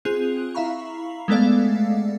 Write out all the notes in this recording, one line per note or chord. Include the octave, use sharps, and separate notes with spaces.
C4 F4 G#4 F#6
E4 E5 F5 A#5 B5 C#6
G#3 A3 B3 A4 D5 F5